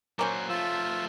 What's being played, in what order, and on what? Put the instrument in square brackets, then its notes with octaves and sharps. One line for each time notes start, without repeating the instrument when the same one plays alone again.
[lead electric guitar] A#2 F#3 [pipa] A#3 C#4 C5
[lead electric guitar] F3 A3 [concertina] F4 E6